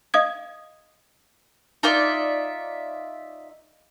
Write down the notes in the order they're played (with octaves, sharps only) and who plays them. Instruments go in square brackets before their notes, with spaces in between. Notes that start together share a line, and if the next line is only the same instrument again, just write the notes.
[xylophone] D#5 F5 D#6 G#6
[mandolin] D#4 F4 D5 E5